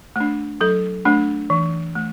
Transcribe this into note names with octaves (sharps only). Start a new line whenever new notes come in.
A3 D4
F#3 A4
A3 D4
E3
A3